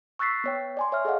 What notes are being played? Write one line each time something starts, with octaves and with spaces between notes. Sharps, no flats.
C#6 E6 F#6 A6 B6 C7
B3 C#5 G5
D5 G#5 C6
C#5 E5 F6
G#4 A4 D#5 F5 F#5